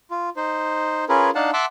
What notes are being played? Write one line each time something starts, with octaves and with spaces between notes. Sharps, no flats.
F4
D#4 C5
C#4 F4 G#4 A#4 B4
D4 D#4 F5 F#5 A5
E5 F#5 A5 C6 D6 E6